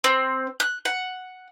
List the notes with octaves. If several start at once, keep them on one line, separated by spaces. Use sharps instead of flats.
C4
F#6
F#5